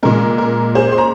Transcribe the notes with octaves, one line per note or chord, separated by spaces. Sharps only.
A#2 G#3 A#4
A#4
G#4 C5
C6
A#5